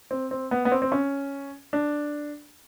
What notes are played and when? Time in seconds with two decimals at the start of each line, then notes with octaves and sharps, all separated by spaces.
0.11 C4
0.31 C4
0.51 B3
0.65 B3
0.72 C4
0.82 C4
0.92 C#4
1.73 D4